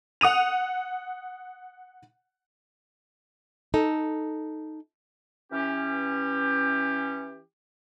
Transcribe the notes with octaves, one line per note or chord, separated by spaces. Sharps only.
F#5 D#6 D#7 F7
D#4 A4
E3 C#4 G4